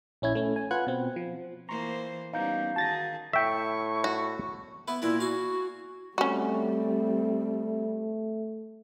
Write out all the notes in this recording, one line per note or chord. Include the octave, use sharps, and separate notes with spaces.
A#1 C#4 E4 G#6
A3 C#4
G#5
F4 B4 F#5 F#6 G#6
B2 C4
F3
E3 A#3 C5 A#5 C6 C#6
G3 B3 C#4 D#4 F5 A#5 G6
D#3 F#4 G#4 A5 A6 A#6
A2 E5 G5 C#6
F#4
B3 E4 B4
A#2 E4 A#4 B4
F#4 F5 G#5
G3 A3 C4 C#4 F#4